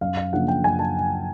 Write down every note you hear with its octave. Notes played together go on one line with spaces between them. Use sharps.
F#2 F5
F5
C#3 F3 A#3 D4 F#5
G5
F#2 G#5
A5